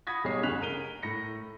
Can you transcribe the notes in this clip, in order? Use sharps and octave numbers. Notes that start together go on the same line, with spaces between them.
F#5 B5 D#6 G#6 A#6 B6
B1 G3 G#4 C#5 D#6 C7
F#1 D2 C#3 F#6 B6 F7
A#4 D#7 G7
A2 A#6 C#7